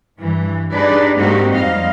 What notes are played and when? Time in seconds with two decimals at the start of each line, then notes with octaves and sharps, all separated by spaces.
0.19 G2 E3
0.73 D4 D#4 G4 G#4 B4 D5
1.17 G#2 A#3 C4 D#4 F#4 G4
1.51 F2 G3 D#5 F5